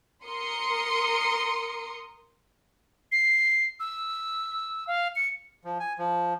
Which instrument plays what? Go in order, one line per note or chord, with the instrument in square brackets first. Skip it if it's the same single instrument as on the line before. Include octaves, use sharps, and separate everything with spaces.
[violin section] A#4 C6 D#6 C#7
[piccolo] C7
E6
F5
C#7
[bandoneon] F3
G#5
F3